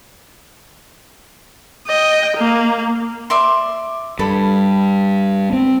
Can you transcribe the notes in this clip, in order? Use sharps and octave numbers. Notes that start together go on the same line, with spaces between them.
D#5 G5
A#3
D5 E5 C6
G2 A4 B5
C4